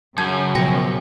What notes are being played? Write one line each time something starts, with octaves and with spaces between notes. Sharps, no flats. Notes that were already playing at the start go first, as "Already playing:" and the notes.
F#2 C#3 A5 G6 G#6
B2 F3 G5 A#6